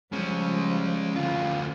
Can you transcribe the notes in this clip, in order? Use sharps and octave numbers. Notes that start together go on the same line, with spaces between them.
F3 G3 G#3 C#4
D2 F4